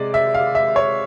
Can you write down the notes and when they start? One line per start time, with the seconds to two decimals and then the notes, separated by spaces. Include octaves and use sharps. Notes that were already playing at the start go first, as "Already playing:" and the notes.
Already playing: C3 G#3 D5
0.14 E5
0.34 F5
0.55 E5
0.76 C#5